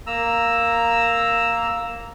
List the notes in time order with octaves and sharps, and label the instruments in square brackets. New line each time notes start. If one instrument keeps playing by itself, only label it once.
[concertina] A#3 A#5 E6